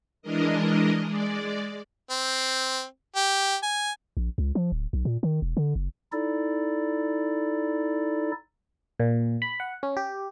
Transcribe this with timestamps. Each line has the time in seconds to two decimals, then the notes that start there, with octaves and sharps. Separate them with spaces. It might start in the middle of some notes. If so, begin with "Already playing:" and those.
0.22 E3 G#3 D4 A#4 D#5
1.05 G#3 D5
2.10 C4
3.16 G4
3.63 G#5
4.17 A#1
4.38 C#2
4.55 F3
4.72 D1
4.93 B1
5.05 A#2
5.23 D#3
5.42 E1
5.57 D3
5.76 F#1
6.12 D#4 E4 A4 D5
9.00 A#2
9.42 B5
9.60 F#5
9.83 C#4
9.97 G4